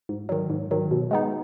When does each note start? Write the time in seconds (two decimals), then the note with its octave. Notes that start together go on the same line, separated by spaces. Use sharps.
0.09 G#2
0.29 D#3 F#3
0.50 G#2
0.71 D#3 F#3
0.91 B2
1.11 G#3 B3 D#4